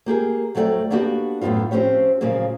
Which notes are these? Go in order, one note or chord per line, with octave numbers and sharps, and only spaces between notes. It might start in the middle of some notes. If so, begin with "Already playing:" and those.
A#3 G4 G#4 A#4
F2 F#3 A3 F#4 D5 G5
A#3 B3 D4 F#4 G4
F#2 A2 E3 B3 F4
F3 C4 C#4 G4 C#5
A#2 C#3 F3 F#3 A#3